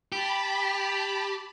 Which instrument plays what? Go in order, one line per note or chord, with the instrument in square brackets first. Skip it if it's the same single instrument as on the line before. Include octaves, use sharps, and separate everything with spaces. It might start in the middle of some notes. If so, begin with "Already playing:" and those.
[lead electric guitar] G4 [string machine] A5 B5